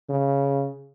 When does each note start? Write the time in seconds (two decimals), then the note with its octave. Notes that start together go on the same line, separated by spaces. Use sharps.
0.10 C#3